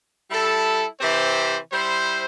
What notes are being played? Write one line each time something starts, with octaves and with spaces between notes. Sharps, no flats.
G3 E4 A4
C3 E3 C4 G4 C5
G3 E4 C5